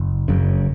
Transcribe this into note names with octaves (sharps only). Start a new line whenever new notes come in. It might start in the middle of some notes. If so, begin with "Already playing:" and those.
Already playing: F#1
F#1 F#2 C#3